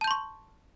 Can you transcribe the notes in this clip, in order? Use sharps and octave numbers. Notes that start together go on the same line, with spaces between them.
A5 C6 C#6 G6